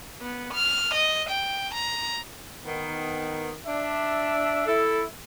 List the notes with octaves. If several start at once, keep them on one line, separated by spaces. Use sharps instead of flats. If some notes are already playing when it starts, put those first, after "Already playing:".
B3
F6
D#5
G5
A#5
D#3 B3
D4 E5
E4 A4